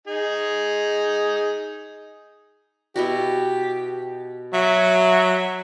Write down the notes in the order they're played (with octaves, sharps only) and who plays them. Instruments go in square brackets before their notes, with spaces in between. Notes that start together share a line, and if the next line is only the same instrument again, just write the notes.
[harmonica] D#4 G#4
[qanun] B2 E4 F#4 [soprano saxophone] G4
[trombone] F#3 [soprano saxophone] E5